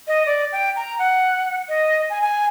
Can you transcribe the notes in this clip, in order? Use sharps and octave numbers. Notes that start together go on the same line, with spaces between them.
D#5
D5
G5
A#5
F#5
D#5
G#5
G#5